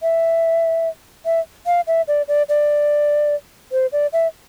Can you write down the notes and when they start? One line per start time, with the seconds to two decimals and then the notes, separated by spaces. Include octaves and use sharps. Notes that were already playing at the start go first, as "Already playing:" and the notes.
0.02 E5
1.25 E5
1.66 F5
1.87 E5
2.08 D5
2.28 D5
2.49 D5
3.72 C5
3.92 D5
4.13 E5